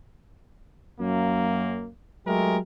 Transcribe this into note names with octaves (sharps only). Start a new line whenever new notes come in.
F#2 A#3
F#3 G#3 A3 G4 A#4